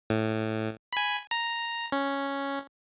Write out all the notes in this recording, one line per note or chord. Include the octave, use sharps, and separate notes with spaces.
A2
G#5 B5
A#5
C#4